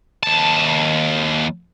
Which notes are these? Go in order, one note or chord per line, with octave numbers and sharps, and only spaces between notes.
D#2 A5